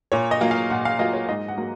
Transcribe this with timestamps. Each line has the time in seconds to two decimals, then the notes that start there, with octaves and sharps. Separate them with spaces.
0.12 A#2 C#5
0.31 D#5
0.41 F#3 A#3 F4
0.51 F5
0.70 A#2 F#5
0.85 F5
0.99 F#3 A#3 F4 D#5
1.14 C#5
1.28 G#2 D#5
1.48 F#5
1.57 F#3 A#3